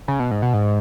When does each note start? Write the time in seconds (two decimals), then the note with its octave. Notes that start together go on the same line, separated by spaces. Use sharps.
0.08 C#3
0.20 B2
0.31 G#2
0.42 B2
0.54 G#2